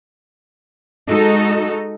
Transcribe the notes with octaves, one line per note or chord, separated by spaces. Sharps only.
G#3 D#4 F#4 A4